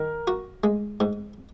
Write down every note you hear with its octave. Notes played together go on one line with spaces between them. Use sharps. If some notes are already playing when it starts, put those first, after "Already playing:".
Already playing: D#3 A#4
F#4
G#3
G#2